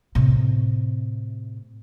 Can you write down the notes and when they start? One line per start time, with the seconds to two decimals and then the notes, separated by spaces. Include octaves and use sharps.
0.15 A2 C3